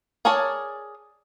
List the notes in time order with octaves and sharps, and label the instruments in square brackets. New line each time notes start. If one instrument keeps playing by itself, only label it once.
[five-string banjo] G#4 A#4 C#5 D5 A5